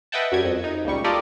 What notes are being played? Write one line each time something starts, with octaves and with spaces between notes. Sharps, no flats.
B4 D#5 E5 F#5 G5 A5
F#2 F#3 G3 G#6
F2
D#4
C#2 A#2 G3 C#6
F4 G4 A4 A#4 D5 D#5